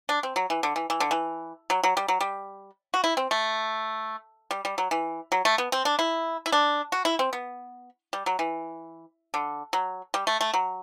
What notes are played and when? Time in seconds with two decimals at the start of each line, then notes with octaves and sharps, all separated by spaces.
0.09 D4
0.23 C4
0.36 F#3
0.50 E3
0.63 D3
0.76 E3
0.90 E3
1.00 D3
1.11 E3
1.70 F#3
1.84 F#3
1.97 G3
2.08 F#3
2.21 G3
2.94 F#4
3.04 E4
3.17 C4
3.31 A3
4.51 G3
4.65 G3
4.78 F#3
4.91 E3
5.32 F#3
5.45 A3
5.58 B3
5.72 C4
5.85 D4
5.99 E4
6.46 E4
6.52 D4
6.92 F#4
7.05 E4
7.19 C4
7.33 B3
8.13 G3
8.26 F#3
8.39 E3
9.34 D3
9.73 F#3
10.14 G3
10.27 A3
10.41 A3
10.54 F#3